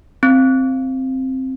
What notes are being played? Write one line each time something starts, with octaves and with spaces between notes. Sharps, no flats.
C4